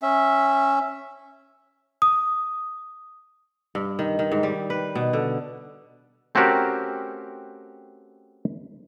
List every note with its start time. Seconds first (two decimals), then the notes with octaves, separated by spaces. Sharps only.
0.02 C#4 E5
2.02 D#6
3.75 G2
3.99 D#3
4.19 D#3
4.32 G#2
4.43 G3
4.70 B4
4.95 B2
5.13 D3
6.35 A3 C4 C#4 F#4 G4 A#4